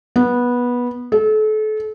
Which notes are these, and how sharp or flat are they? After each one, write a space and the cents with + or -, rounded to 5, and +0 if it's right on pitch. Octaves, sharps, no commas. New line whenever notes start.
B3 -15
A4 -35